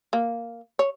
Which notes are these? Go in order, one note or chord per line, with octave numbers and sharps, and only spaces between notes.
A#3
C#5